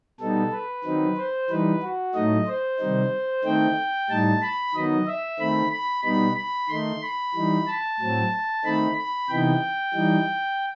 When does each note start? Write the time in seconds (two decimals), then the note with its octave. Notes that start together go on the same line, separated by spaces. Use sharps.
0.20 B2 G3 B3 D#4 A4
0.52 B4
0.85 D#3 F#3 C4 D#4
1.17 C5
1.50 E3 G3 D#4 B4
1.83 F#4
2.15 A2 F#3 A3 D#4 D#5
2.48 C5
2.79 C3 D#3 G3 D#4
3.44 D#3 A3 C4 D#4 G5
4.10 A2 G3 D#4 A5
4.42 B5
4.75 D#3 F#3 B3 D#4 D#5
5.07 E5
5.39 D#3 A3 C4 B5
5.72 B5
6.04 B2 G3 B3 D#4 B5
6.37 B5
6.69 D#3 A3 D#4 C6
7.02 B5
7.34 E3 G3 D#4
7.67 A5
8.00 A2 F#3 C4
8.65 D#3 A3 C4 D#4 B5
8.97 B5
9.29 C3 E3 B3 D#4 G5
9.94 E3 G3 D#4